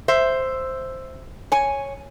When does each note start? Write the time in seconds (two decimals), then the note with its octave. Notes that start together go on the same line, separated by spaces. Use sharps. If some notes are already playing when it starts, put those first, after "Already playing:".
0.08 C5 E5
1.52 C#5 G#5